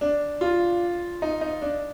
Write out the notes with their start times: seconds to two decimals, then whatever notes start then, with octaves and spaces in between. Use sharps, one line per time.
0.01 D4
0.41 F4
1.22 D#4
1.41 D#4
1.62 D4